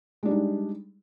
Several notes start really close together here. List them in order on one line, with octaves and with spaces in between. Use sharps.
G#3 D4 G3 D#4